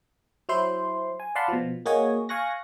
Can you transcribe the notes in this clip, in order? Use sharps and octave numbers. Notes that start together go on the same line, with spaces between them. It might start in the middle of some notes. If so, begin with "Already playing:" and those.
F#3 E4 C5 C6
G#5
D5 F5 F#5 A5 B5 C6
B2 F3
A#3 F#4 G#4 C#5 D#5 G#5
F5 G#5 C#6 F#6 A#6